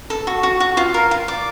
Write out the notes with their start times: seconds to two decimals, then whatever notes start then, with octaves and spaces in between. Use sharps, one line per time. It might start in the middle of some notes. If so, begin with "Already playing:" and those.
0.10 A4
0.27 F#4
0.43 F#4
0.60 F#4
0.77 F4
0.94 A#4
1.11 F4
1.28 D5